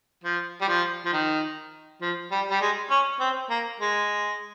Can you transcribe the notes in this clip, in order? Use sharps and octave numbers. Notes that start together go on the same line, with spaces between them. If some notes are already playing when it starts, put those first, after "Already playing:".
F3
G3
F3
F3
D#3
F3
G3
G3
G#3
C#4
C4
A#3
G#3